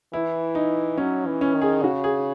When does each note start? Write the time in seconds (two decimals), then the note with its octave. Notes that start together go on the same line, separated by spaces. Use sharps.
0.13 E3 E4
0.55 D#4
0.98 F#3 C#4
1.26 E3
1.41 C#4
1.55 D#3
1.62 G#4
1.83 C#3 F#4
2.04 G#4